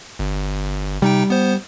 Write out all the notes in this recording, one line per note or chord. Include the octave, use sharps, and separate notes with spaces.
G1
C3 G3 D#4 G5
B3 C5